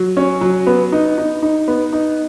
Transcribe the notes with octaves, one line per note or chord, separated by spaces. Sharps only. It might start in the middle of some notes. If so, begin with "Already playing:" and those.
Already playing: F#3
C#4
F#3
B3
D#4
D#4
D#4
B3
D#4